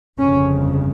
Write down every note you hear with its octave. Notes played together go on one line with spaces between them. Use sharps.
G1 F2 C#3 C#4